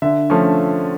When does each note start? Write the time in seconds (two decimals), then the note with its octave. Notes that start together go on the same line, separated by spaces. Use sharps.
0.02 D3 E5
0.30 F3 A3 C#4